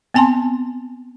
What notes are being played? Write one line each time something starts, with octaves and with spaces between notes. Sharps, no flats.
B3 C4 G#5 A5 C6